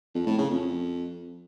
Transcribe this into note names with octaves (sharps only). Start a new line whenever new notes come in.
F2
A2
C#3
F2